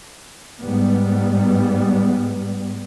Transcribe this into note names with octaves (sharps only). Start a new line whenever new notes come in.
G#2 G3 B3